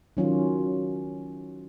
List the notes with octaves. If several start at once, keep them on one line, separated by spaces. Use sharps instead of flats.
D#3 F#3 C#4 F4